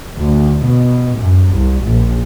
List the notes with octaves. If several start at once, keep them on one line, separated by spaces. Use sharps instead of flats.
D2
B2
F#2
C2
A#1